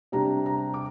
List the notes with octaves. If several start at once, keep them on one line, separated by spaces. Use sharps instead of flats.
C3 G3 D4 A#5
A#5
D6